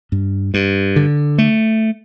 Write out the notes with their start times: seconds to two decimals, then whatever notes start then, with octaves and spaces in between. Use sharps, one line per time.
0.12 G2
0.54 G2
0.96 D3
1.38 A3